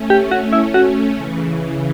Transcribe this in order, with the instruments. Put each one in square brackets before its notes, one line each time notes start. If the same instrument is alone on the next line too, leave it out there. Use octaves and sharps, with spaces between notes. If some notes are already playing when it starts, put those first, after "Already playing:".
Already playing: [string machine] A3 C#4
[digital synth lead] G4
[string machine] A3 C#4
[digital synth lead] F#4
E4
F#4
[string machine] C#3 E3